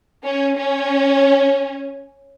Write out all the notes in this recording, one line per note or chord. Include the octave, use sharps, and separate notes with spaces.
C#4
C#4